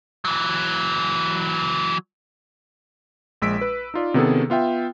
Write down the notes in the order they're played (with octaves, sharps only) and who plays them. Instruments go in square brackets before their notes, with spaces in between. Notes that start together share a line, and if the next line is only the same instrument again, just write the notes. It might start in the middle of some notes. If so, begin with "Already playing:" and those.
[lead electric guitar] E3 F#3
[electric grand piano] A#1 G#3 E6 B6 D7
B4
D#4 F4 D5
C3 D#3 B3 C#4 G#4 A4
B3 F4 E5 G5